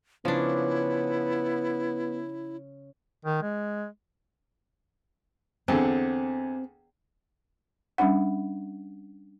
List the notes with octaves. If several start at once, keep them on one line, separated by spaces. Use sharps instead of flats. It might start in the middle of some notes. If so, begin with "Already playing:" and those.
C#3 F3 B3 D4 E4
D#3
G#3
E2 D3 C4
G3 C#4 D4 F#5